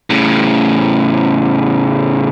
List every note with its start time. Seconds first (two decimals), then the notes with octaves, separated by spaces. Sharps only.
0.10 A2 C#3